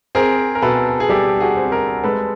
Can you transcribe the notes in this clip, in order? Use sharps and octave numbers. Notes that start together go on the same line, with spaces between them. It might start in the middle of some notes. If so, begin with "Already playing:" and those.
C4 G#4 A#4
A#4
B2 A4 B4
G#4
G3 G4 A4
F#4 G#4
C4
G#4 A#4
G#3 A4 B4